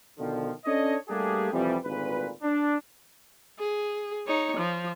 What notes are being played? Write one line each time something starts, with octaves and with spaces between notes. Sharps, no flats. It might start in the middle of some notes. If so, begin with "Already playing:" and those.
B2 D3 D#3 F3
C#4 D4 A4 C#5 D#5
G3 A3 A#3 D4 G4 G#4
F2 C3 E3 F3 G3
G#1 D2 A#2 B4
D4
G#4
D#4 C#5
F3